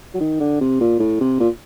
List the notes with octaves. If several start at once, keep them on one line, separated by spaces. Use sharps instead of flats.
F#3
D#3
D3
C3
A#2
A2
C3
A#2